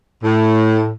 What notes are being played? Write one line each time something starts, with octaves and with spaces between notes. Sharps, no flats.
A2